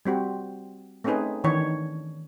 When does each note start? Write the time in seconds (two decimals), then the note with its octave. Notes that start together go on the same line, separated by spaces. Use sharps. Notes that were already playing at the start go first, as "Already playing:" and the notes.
0.05 G3 C4 F#4 G4
1.04 A3 C4 C#4 D#4 G#4 B4
1.44 D#3 E3 D4 C#5